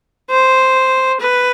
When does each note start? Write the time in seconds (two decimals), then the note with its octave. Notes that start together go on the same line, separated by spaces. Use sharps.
0.30 C5
1.20 B4